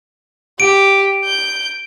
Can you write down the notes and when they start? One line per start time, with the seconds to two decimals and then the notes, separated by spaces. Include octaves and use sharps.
0.60 G4 D7
1.24 G6